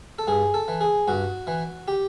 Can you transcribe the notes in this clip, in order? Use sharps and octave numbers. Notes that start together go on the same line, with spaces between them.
A4
G2 G#4
A4
E3
G#4
G2 F#4
E3
G4